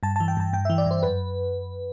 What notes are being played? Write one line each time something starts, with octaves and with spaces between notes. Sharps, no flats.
G2 A5
E3 A5
G5
G2 A5
G2 G5
E3 E5
D5
G2 C5
F#2 B4